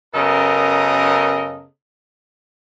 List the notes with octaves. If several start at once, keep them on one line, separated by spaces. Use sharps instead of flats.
F#2 C#3 B3 A4 A#4 D#5